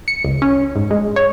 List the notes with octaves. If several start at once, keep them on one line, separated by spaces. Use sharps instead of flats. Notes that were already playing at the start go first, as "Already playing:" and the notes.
C#7
C#2
C#4
G#2
G#3
C#5